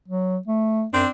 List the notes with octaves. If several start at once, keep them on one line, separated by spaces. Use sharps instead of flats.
F#3
A3
F#2 C4 D4